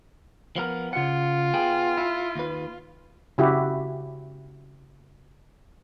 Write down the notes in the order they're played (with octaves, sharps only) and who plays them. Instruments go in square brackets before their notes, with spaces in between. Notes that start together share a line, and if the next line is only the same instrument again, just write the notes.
[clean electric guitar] F3 B3 A#4
[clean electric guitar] C#3 F#5 [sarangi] F4
[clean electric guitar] B3 G#4 G5
E4
D#2 B4
[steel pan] C#3 E4 F#4 G4